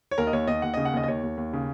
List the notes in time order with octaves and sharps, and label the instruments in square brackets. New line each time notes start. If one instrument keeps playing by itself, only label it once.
[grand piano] C#5
D#2 A#4
D#5
D#2 C#5
D#2 D#5
D#2 F#5
C#3 D#5
F#5
D#2 D#5
D#5
D#2 C#5
D#2
D#2
C#3